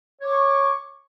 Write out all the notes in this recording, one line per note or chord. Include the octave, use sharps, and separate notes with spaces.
C#5 C#6 D6